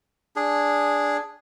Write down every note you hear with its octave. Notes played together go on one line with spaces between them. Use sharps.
D4 G#4